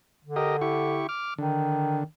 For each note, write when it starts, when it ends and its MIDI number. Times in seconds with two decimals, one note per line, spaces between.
0.25 1.04 50
0.36 0.57 67
0.36 0.57 70
0.36 0.57 75
0.61 1.07 64
0.61 1.07 67
0.61 1.07 85
1.09 1.34 86
1.09 1.34 89
1.38 2.04 50
1.38 2.04 51